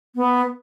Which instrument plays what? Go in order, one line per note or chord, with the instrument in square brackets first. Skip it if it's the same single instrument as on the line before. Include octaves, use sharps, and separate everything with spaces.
[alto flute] B3